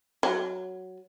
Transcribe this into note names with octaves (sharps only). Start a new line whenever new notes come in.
F#3